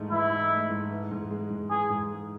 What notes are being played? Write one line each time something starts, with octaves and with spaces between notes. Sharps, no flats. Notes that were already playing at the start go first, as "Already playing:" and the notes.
Already playing: G#2 E3 A3 D#4
E3 E4
D#4
A3
G#2
E3
G#2
G#3
G#2
E3 G#4
G#2
G#3